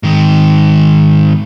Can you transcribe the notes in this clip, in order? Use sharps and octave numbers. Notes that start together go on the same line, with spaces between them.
G#2 D#3